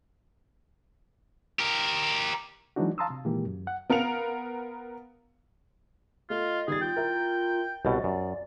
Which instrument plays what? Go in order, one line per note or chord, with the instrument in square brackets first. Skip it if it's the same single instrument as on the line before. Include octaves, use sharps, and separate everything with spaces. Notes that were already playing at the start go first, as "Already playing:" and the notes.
[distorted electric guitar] G4 A#4
[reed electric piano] E3 F#3 G#3 D4 D#4 F#4
F5 A5 A#5 C6 D#6 E6
C3
A#2 D#3 E3 G#3 A#3 G4
F#2
F#5
[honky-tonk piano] B3 A#4 F5 C#7 F7
[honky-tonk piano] A3 [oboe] F4 [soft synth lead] D#5
[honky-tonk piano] D#3 G3 A6 [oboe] G#4
[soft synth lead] F4 [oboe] G5
[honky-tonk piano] E4 A#4
[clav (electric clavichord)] C2 B2 [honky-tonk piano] C#5 A6 [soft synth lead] D#5
[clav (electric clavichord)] F#2 [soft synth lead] D5